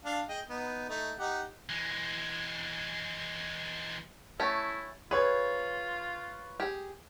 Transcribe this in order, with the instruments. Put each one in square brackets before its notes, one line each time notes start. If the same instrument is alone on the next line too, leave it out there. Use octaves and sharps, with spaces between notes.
[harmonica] D4 F5
G#4 D#5 G5
B3 D#4
A3 D#4
D#4 G4 F#5
[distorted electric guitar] E3 G#3
[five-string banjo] A3 C#4 [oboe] E4
[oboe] F4 [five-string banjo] G#4 [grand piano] B4 C#5
[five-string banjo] G4 G#4